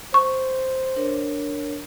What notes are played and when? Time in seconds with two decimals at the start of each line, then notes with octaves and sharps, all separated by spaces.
0.14 C5 C#6
0.96 D4 A#4 C#5